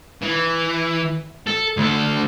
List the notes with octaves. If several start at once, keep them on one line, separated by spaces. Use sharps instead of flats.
E3
A4
D2 A4